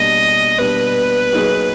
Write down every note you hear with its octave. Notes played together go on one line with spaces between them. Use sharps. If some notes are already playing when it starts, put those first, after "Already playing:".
Already playing: B2 G3 A#3 D4 D#5
B2 G3 A#3 D4 B4
F#3 A#3 D#4 G#4